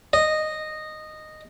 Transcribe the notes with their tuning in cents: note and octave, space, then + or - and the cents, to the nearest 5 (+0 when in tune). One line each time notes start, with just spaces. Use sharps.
D#5 -10